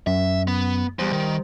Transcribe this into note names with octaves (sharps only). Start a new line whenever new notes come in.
F#2 E5
B3
E2 G3 C5
D#3